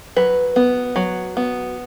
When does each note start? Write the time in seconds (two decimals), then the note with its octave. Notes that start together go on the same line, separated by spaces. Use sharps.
0.16 F#3 B4
0.56 B3
0.96 F#3
1.37 B3